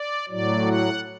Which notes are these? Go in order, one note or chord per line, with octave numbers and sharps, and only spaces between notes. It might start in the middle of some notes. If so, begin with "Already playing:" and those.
Already playing: D5
A2 F#3 D5
F#5